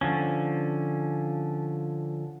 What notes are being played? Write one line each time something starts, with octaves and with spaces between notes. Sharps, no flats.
D3 F3 C#4